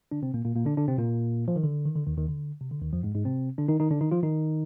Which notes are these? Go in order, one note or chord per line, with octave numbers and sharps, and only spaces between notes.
D3 D4
C3 C4
A#2 A#3
A#2 A#3
A#2 A#3
D3 D4
D3 D4
C3 C4
A#2 A#3
F3
D#3
D3
D#3
D3
D#2 D#3
D#2 D#3
D3
C3
D3
D#2 D#3
F2 F3
G#2 G#3
G#2 G#3
C3 C4
D3 D4
D#3 D#4
D#3 D#4
D3 D4
D#3 D#4
F3 F4
D#3 D#4